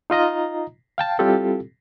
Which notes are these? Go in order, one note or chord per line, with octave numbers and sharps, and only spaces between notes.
D#4 F4 D#5 A#5
F5 G5 A5
G3 C4 E4 F4 G4 A4